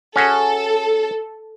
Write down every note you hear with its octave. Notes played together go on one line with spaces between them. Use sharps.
C#4 F#4 G#4 A4